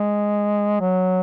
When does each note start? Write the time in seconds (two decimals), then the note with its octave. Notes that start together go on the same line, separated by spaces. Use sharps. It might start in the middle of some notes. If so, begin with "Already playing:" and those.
Already playing: G#3
0.81 F#3